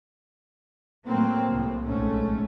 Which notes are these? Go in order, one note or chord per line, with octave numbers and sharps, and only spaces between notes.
A2 F#3 A3 A#3 C4
C2 A2 C3
A#1 G#2 A3 C#4